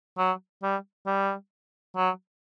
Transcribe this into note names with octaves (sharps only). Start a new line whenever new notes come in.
F#3
G3
G3
F#3